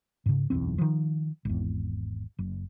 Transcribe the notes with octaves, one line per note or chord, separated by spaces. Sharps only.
G#2 C#3
F#1 B1 E2 C4
D#3 F3
G#1 E2
F#1